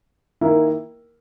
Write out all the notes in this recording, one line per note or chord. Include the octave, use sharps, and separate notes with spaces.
D#3 A#3 E4 A#4